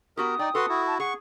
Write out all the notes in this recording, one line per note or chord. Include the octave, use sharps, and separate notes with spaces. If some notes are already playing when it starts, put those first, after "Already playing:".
B3 F#4 G4 A#4 D#6
D#4 D5 G5
F#4 A4 B4 C6
E4 F#4
A5
G#4 F#5 C#6